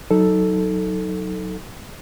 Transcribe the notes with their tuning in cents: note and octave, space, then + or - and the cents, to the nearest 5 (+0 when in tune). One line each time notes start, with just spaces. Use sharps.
F#3 +0 D#4 +15 A4 +0